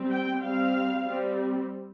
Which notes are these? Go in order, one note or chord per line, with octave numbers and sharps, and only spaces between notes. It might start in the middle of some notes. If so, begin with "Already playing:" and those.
Already playing: G3 C4
G5
G3 C4 F5
G3 C4